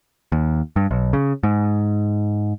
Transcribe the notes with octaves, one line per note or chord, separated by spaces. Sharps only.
D#2
G2
B1
C#3
G#2